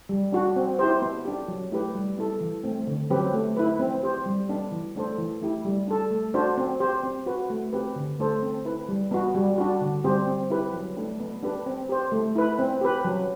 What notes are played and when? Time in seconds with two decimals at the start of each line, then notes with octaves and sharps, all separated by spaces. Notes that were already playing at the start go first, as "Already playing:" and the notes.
0.09 G3
0.32 D4 F#4
0.56 C4
0.79 E4 G4 C5
1.02 B3
1.25 D4 G4
1.48 F#3
1.71 A3 E4 G4 B4
1.95 G3
2.18 B3 E4 A4
2.41 E3
2.64 A3 C4
2.87 D3
3.10 F#3 C4 G4 B4
3.33 A3
3.57 E4 B4
3.79 C4
4.03 G4 C5
4.26 G3
4.49 B3 D4
4.72 E3
4.96 A3 D4 A4 C5
5.18 E3
5.42 A3 E4 G4
5.65 G3
5.88 D4 A4
6.11 A3
6.34 D4 F#4 C5
6.57 C4
6.80 G4 C5
7.03 C4
7.26 F#4 B4
7.50 A3
7.73 C4 G4 B4
7.96 D3
8.19 A3 D4 A4 C5
8.42 C4
8.65 E4 B4
8.89 G3
9.11 B3 F#4
9.35 G3
9.58 D4 F#4
9.81 D3
10.04 G3 C4 G4 C5
10.27 C4
10.50 E4 G4 B4
10.74 F#3
10.97 A3 D4
11.20 B3
11.43 D4 G4 B4
11.66 C4
11.89 G4 C5
12.12 A3
12.36 E4 B4
12.59 C4
12.81 G4 B4
13.05 F#3